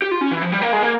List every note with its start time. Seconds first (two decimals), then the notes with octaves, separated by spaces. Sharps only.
0.02 G4
0.11 F4
0.21 C#4
0.31 E3
0.42 F3
0.52 G3
0.62 A#3
0.73 G#3
0.83 A#3